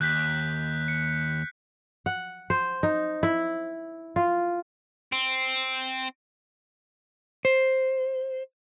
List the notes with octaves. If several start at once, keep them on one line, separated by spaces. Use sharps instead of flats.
D#2 F#6 G6 B6
C#7
F#5
C5
D#4
E4
F4
C4
C5